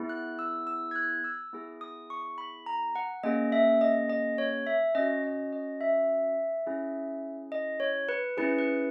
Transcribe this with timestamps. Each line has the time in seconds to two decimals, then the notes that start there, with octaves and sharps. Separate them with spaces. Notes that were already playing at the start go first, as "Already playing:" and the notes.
Already playing: B3 E4 G#4
0.09 F#6
0.39 E6
0.67 E6
0.91 G#6
0.96 F#6
1.24 E6
1.53 B3 E4 G#4
1.81 D#6
2.10 C#6
2.38 B5
2.66 A#5
2.95 F#5
3.23 A#3 C#4 G#4 D#5
3.52 E5
3.81 D#5
4.10 D#5
4.38 C#5
4.67 E5
4.95 C#4 F#4 D#5
5.24 D#5
5.53 D#5
5.81 E5
6.66 C#4 E4 G#4
7.52 D#5
7.80 C#5
8.09 B4
8.37 C#4 E4 G#4 B4
8.59 B4